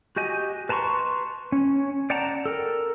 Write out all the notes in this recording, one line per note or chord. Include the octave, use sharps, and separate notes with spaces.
F#4 G4 D#5 G#5
B4 A5 A#5 C6 C#6
C#4
D5 F#5 G5 A5 A#5
A4 A#4